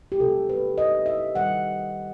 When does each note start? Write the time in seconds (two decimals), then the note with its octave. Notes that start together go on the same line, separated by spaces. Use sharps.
0.12 G4
0.20 C3 F#3 A3 A4
0.49 B4
0.78 D#5
1.06 E5
1.35 D#3 G3 F#5